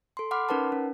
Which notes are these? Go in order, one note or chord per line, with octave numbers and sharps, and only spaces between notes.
A4 C6
F#5 B5 C6 D6 F6
C#4 D#4 A#4 B4 F#5 A5
C#4